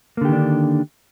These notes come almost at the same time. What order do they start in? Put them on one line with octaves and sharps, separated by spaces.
A#3 D3 G4 D#3 D4